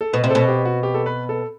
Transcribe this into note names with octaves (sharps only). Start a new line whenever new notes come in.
A4
B2 B4
C3
B2 A4
G4
F#4
G4
A4
B4
A4